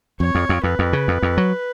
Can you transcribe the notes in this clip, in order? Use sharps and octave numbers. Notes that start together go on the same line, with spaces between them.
F2 C#5
F2
F2
F2 B4
F2
C#3
F2
F2
F#3